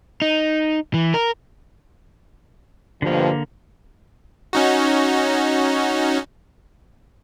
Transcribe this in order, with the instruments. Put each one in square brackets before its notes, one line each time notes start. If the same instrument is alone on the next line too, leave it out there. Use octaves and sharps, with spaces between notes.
[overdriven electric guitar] D#4
E3
A#4
[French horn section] G2 B2 F3 [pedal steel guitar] D3 A#3
[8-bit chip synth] C#4 D#4 F#4